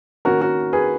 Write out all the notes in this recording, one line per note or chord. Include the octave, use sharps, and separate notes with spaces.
D#3 A#3 C#4 F#4 A#4
F#4 A#4
G#4 B4